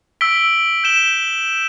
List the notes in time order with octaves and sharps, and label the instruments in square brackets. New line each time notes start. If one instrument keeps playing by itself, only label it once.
[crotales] E6 B6 D7 G7
G6 E7 G7